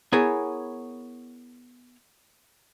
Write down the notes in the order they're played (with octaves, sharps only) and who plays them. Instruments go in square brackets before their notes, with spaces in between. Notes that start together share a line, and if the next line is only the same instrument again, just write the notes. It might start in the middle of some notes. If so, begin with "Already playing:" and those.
[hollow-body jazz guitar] B3 E4 G#4 A#4 C#5 G#5